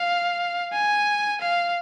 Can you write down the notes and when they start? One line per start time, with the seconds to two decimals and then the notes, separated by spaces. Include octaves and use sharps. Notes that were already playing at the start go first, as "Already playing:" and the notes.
Already playing: F5
0.73 G#5
1.41 F5